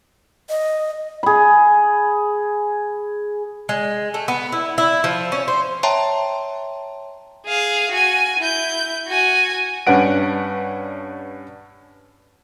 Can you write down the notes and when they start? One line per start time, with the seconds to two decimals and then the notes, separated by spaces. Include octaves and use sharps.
0.50 D#5
1.23 G#4 B5
3.69 G#3
4.14 A3
4.28 B3
4.52 E4
4.78 E4
5.04 F3
5.32 C#4
5.48 C5
5.83 C#5 E5 G5 A5 A#5 C6
7.46 G#4 F5
7.92 F#4 G#5
8.39 E4 G6
9.07 F#4 G#5
9.87 G2 C#4 D4 B4 F#5 D7